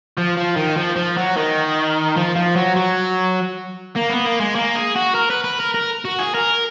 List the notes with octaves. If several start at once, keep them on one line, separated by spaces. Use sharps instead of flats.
F3
F3
D#3
F3
F3
F#3
D#3
F3
F3
F#3
F#3
A#3
B3
A#3
G#3
A#3
G#4
F#4
A#4
B4
B4
A#4
A#4
F#4
G#4
A#4